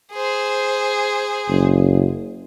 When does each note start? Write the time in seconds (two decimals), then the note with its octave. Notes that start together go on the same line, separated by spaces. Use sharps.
0.12 G#4 C5
1.48 F#1